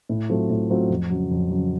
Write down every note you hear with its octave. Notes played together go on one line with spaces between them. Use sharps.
A2
F#3 A3 C4 F4
A2
F#3 A3 C4 F4
F2
C#3 F#3
F2
C#3 F#3